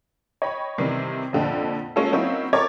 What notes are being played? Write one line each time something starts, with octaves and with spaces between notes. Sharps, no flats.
C#5 D#5 G5 B5
C3 D#3 E3 G3
F2 A#2 D3 F3 D#5 G5
G#3 A#3 C#4 D#4 F4 A4
F#3 A#3 C4 C#4 D#4 E4
A4 A#4 C#5 D6 G#6 A6